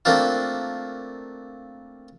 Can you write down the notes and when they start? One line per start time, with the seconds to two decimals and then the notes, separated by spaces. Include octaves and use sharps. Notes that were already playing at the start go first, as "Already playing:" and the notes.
0.05 A3 A#3 C4 D4 F4